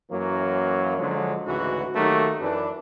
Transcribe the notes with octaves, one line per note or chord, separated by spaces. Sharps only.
F#2 E3 F#3 A#3
D3 F3 F#3 G#3
D2 G#2 C#3 E3 F#4
D#3 F#3 A3 A#3 F#4 G4
F#2 E3 D4